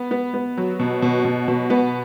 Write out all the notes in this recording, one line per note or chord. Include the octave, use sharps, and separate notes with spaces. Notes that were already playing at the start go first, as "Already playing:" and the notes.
Already playing: B3
B3
B3
F#3
B2
B2
B2
B2
B3